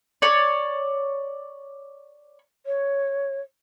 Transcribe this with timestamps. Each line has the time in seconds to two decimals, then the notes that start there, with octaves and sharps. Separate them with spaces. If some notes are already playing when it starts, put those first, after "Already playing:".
0.22 C#5 D5
2.66 C#5